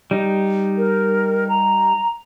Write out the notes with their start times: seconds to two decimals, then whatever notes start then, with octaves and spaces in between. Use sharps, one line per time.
0.11 G3 D#4
0.78 A#4
1.49 A#5